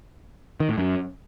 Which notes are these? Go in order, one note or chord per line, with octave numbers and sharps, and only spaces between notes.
D#3
A2
F#2